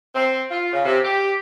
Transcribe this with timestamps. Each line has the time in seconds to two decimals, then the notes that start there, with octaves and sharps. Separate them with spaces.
0.15 C4
0.51 F4
0.72 C#3
0.85 C3
1.05 G4